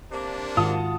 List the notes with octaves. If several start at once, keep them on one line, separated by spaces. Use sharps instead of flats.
C3 A#3 D4
G#2 D#3 F4 F#4 A5 D#6